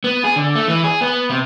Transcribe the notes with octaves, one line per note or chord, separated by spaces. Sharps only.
B3
G#4
D3
A3
E3
G#4
B3
C3